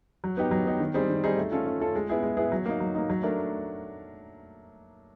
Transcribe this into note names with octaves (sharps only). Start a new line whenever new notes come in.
F#3
B3 D#4 G4
F#3
B3 D#4 G4
D#3
G3 C4 D#4 G#4
D#3
G3 C4 D#4 G#4
A3
C#4 F4 A4
A3
C#4 F4 A4
G#3
B3 E4 G#4
G#3
B3 E4 G#4
F#3
A#3 D#4
F#3
A#3 D#4
F#3
A3 D4 A#4